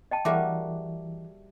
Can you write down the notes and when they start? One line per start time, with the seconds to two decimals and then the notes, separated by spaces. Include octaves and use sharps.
0.11 D#5 G5 A5
0.25 E3 G3 A#3 F#4 G#4 E5 D6